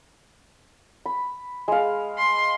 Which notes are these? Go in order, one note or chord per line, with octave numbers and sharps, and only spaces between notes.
B5
G#3 F5
C6